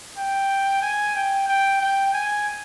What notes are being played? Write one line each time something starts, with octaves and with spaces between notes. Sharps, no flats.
G5
G#5
G5
G5
G5
G#5